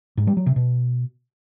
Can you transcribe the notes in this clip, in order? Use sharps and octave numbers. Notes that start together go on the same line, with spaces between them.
G#2
G3
F#3
C3
B2